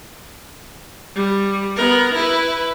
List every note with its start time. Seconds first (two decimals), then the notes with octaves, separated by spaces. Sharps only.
1.16 G3
1.76 B3 A#4
2.15 E4 B4